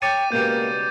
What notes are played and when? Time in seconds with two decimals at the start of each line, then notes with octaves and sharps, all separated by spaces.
0.02 C#5 G5 A5 C#6 D6 A6 D#7
0.32 C#2 B2 G3 A#3 G6